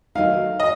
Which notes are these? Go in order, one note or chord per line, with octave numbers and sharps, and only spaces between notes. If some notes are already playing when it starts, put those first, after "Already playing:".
D#3 F#3 A3 D#4 F5
D#5